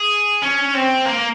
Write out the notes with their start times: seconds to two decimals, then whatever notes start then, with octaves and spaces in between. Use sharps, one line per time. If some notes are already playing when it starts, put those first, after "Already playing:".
Already playing: G#4
0.42 C#4
0.74 C4
1.05 A#3